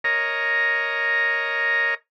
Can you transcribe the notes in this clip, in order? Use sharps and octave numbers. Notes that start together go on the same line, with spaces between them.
A#4 C#5 D#5 A#5